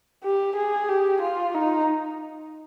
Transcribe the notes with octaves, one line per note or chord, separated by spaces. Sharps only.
G4
G#4
G4
F4
D#4